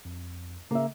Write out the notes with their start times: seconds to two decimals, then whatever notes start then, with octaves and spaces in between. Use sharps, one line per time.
0.05 F2
0.71 C#3 A#3 E5